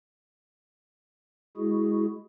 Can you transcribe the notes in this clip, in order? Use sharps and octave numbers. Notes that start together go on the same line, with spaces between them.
G#3 E4 F#4 G#4